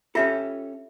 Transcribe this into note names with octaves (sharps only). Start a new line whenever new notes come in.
C#4 F4 G4 A4 E5